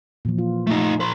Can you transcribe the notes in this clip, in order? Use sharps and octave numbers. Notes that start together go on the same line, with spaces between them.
A#2 E3 F3
F4
A3 D#4
A#4 C5